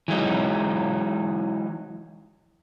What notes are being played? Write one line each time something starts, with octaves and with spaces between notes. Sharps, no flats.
E3 F#3 G#3 D#4